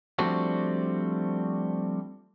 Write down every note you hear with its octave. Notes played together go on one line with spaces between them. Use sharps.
F3 G3 A3 C4 D4 F#4